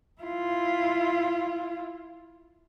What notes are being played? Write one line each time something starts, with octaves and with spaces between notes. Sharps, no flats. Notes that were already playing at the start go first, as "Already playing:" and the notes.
E4 F4